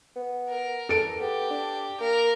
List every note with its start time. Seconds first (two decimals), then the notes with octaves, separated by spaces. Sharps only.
0.16 B3
0.50 A#4
0.89 E2 A4 D7
1.20 B3 G4
1.50 D4
2.00 A#3 A#4